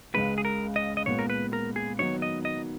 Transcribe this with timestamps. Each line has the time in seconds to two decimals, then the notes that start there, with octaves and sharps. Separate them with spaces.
0.15 C#2 C#3 G#3 B4
0.38 G#4
0.45 A#4
0.76 D#5
0.97 D#5
1.06 A#2 G#3 B3 C#5
1.19 A#4
1.30 B4
1.53 A#4
1.76 G#4
1.99 D#3 F#3 B3 D#4 C#5
2.22 D#5
2.45 D#5